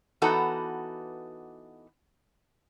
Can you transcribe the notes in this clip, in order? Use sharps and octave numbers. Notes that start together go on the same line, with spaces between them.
E3 B3 D#4 F#4 A4 A#5